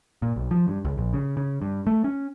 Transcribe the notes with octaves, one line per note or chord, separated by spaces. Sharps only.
A#2
B1
F3
G2
C#2
A#1
C#3
C#3
G2
A3
C#4